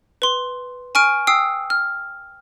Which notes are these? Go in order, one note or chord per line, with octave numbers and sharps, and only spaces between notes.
B4 C6
G#5 C#6 F6 D7
G5 D#6 E6 C7
F6